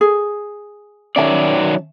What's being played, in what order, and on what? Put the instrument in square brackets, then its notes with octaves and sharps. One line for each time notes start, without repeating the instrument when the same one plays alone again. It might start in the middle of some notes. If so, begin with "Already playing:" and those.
[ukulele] G#4
[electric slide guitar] D#3 F#3 D5 [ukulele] C#4 E5 A5